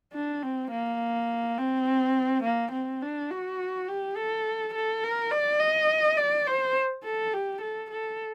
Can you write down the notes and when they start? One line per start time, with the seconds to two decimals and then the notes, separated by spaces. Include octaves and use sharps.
0.14 D4
0.43 C4
0.71 A#3
1.58 C4
2.44 A#3
2.72 C4
3.02 D4
3.31 F#4
3.88 G4
4.16 A4
4.75 A4
5.03 A#4
5.31 D5
5.60 D#5
6.17 D5
6.47 C5
7.04 A4
7.34 G4
7.62 A4
7.91 A4